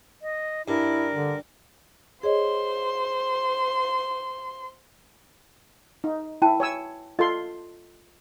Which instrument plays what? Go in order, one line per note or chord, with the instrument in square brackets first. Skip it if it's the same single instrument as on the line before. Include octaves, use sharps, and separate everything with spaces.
[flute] D#5
[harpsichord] G2 [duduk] E4 [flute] A#4
[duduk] D3
[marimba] G#4 C#5 D#5 [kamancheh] C5 C6
[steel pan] D#4
[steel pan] E4 [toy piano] G5 A5
[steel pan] C#5 G#5 E6
[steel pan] F4 A4 C6 [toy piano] D#5